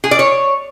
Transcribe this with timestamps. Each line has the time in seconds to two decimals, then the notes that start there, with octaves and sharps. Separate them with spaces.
0.04 G#4
0.11 D5
0.19 C#5